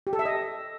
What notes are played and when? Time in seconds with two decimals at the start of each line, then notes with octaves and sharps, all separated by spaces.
0.07 G4
0.13 A4
0.19 E5
0.25 D#5